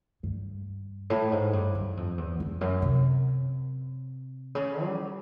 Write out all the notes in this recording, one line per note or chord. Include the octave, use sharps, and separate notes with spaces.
G2
A2
G#2
G2
F#2
F2
E2
F2
F#2
C3
C#3
G3